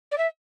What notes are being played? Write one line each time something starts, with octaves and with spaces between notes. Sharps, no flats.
D5
E5